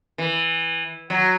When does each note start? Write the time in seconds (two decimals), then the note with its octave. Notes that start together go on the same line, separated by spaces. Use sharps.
0.18 E3
1.10 F#3